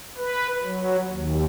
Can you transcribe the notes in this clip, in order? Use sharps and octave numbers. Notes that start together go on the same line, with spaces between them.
B4
F#3
D#2